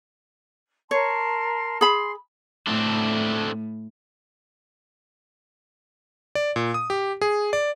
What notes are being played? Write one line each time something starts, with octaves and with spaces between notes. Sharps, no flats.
A#4 C#5 A5 C6
G#4 B5 C6
A2 A3 C4 D4
D5
A#2
D#6
G4
G#4
D5